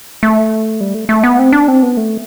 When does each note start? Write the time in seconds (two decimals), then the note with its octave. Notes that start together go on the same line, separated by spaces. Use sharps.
0.23 A3
0.81 G3
0.94 A3
1.09 A3
1.24 B3
1.39 C4
1.53 D4
1.68 C4
1.83 B3
1.97 A3